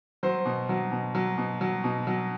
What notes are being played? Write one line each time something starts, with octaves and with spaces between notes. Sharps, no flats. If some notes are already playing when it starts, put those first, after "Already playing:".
F#3 C5
B2
F#3
B2
F#3
B2
F#3
B2
F#3